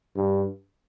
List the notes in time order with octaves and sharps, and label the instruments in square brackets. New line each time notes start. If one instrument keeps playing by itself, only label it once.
[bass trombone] G2